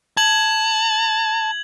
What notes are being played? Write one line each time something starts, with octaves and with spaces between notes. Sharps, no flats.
A5 G#6 F#7